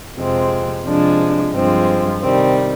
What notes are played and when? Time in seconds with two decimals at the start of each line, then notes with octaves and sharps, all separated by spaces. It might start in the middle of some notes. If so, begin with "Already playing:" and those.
0.17 F2 C3 F3 G#3 C4
0.85 C3 F3 G#3 D4
1.53 G2 F3 G#3 C4
2.22 C3 D#3 G3 C4